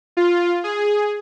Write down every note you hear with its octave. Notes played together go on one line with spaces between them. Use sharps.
F4
G#4